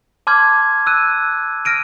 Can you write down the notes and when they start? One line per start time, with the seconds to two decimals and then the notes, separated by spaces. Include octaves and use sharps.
0.27 A5 C6 D6 F6 G6 G#6
0.87 E6 F#6 D#7
1.65 F6 A#6 D7 D#7